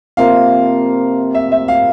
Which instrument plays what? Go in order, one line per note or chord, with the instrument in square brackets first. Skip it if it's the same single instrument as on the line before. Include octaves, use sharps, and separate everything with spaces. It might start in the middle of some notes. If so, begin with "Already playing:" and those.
[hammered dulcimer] C3 F3 A#3 F4 [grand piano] F5
[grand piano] E5
E5
F5